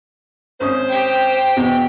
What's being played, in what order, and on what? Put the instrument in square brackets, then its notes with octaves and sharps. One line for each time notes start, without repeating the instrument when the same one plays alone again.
[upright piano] G#1 C#4 D#6 [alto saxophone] C5
[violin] G4 G5
[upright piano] E2 B2